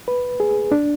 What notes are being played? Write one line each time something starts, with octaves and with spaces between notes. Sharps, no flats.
B4
G#4
D4